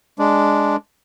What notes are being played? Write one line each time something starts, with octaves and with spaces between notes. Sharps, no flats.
G#3 D4